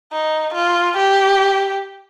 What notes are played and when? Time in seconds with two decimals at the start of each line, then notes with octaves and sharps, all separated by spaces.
0.12 D#4
0.54 F4
0.97 G4